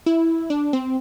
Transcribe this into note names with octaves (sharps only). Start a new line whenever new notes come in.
E4
D4
C4